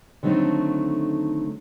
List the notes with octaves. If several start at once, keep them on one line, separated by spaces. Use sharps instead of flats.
D3 D#3 F#3 A3 C4 D#4